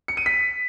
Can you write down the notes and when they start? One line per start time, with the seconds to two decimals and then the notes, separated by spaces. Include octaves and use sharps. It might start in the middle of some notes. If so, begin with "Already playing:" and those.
0.08 C#7
0.17 D#7
0.26 B6